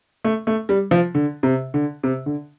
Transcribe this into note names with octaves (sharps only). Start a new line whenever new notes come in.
A3
A3
G3
F3
D3
C3
D3
C3
D3